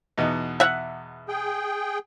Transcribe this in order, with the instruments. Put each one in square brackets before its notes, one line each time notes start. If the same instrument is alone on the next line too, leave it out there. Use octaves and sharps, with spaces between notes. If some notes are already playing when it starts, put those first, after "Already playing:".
[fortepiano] E2 B2 D#4
[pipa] E5 F#5
[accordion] G#4 G5